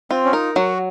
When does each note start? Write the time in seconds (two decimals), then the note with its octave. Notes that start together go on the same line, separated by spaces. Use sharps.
0.11 C4 F4
0.25 C#4
0.33 D#4 A#4
0.56 F#3 F#4